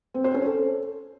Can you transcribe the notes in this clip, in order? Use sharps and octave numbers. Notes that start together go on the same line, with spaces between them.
C4
C5
C#4
A4